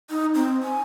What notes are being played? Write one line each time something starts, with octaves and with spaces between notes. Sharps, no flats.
D#4
C4
G#5